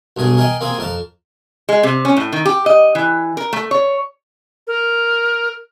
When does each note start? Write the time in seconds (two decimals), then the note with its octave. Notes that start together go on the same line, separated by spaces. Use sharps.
0.17 B1 G2 G#4 A#4
0.37 G#4 A#4 D#5 G5
0.61 A#3 C4 G#4
0.78 F2 A#4 A5
1.69 G#3
1.83 C3
2.05 C#4
2.17 A2
2.32 D#3
2.45 G4
2.66 D#5
2.95 E3
3.37 A#4
3.53 A3
3.71 C#5
4.67 A#4